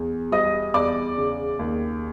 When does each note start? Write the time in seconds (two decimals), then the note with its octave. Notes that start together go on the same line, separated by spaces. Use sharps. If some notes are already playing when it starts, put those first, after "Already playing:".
Already playing: E2
0.32 G3 D#5 D#6
0.74 E2 D5 D6
1.17 C#3
1.59 D#2